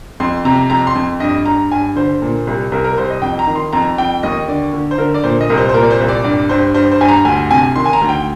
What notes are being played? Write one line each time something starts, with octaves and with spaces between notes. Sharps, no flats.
F2 C6
C3 A#5
F2 A#5
C6
F2
G2 D#5
G2 A#5
G2 G#5
D3 C5
A#2
C2
C2 A#4
A#4
C2 C5
D#5
F2 G5
A#5
D#3
C6
F2 A#5
F2 G5
D#2 D#5
D3 D5
D3
C5
D3 A#4
D5
A#2 C5
D#5
C2 A#4
C5
C5
A#2 A#4
D5
C5
C2
D5
G2 D5
G2 C5
G2 C5
C5
G2 G#5
A#5
D2 G#5
C3 G#5
D#3 C6
G#5
A#5
D2
G5